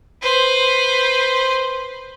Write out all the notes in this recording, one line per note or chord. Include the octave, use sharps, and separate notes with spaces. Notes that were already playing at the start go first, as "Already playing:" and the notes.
B4 C5